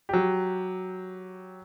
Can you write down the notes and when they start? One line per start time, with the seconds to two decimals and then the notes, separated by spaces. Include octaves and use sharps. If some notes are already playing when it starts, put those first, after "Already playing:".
0.09 F#3 G4